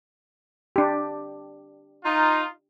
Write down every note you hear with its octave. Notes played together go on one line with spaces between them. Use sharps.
D4 G4
D#4 F4